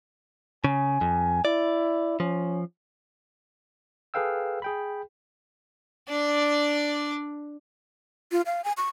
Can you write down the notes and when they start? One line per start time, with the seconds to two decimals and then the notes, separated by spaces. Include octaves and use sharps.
0.64 C#3 G#5
1.01 F2
1.45 E4 D5
2.20 F3 C#4
4.14 G#4 A4 B4 F5 G5 E6
4.62 G#4 G5 B5
6.09 D4 D5
8.32 F4
8.46 F5
8.64 G#5
8.77 C#6